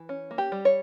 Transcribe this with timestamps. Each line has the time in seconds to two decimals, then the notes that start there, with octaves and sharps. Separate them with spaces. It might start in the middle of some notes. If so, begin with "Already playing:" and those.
Already playing: E3
0.09 C#4
0.31 A#3
0.38 G4
0.52 G3
0.65 C#5